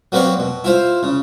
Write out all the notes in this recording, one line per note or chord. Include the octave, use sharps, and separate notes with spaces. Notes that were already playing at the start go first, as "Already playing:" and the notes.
F#3 A#3 C4 B4 C#5 D5
B2
E4 F4 C5
C#3